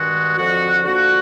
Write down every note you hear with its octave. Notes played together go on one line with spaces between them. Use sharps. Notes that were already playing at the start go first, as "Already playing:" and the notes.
Already playing: G2 D#3 G#3 F#4
F2 D3 F3 F#4
D3 F3 A#3 F#4